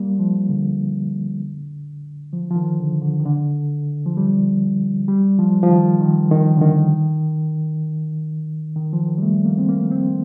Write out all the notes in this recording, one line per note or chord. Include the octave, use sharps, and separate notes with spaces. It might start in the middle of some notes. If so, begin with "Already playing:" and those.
Already playing: G3 A#3
F3
D3
F3
F3
D#3
D3
D3
D#3
D3
F3
G3
G3
F3
F3
D#3
D#3
D#3
D3
D#3
D#3
F3
D#3
G3
A3
A#3
C4
A#3
C4